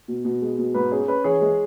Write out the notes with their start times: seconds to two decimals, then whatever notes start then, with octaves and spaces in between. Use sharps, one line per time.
0.08 B2
0.25 B2
0.41 G#3
0.59 B2
0.74 G#2 B4
0.91 C#4 G#4
1.08 C#4 B4
1.24 E3 G#4 C#5
1.41 G#3